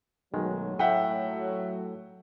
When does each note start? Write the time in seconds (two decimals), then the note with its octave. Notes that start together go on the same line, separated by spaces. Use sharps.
0.34 B1 D#3 F#3 G#3 A3
0.79 A2 E5 F#5 G5